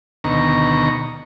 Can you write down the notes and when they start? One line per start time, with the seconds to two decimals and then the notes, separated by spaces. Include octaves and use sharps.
0.24 D2 B2 D#3 A#5 C#6